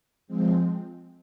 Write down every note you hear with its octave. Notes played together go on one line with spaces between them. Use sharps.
F3 G#3 C4